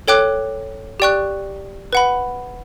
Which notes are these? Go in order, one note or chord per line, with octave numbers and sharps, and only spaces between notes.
A4 C#5 G5 D6 F#6
G4 D5 G5 C#6 F#6
B4 F#5 B5